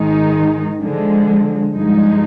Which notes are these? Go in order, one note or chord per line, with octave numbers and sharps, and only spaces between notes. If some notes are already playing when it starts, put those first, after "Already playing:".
Already playing: G#2 D#3 G#3 D#4
D3 F3 G#3
G2 F3 G#3 D#4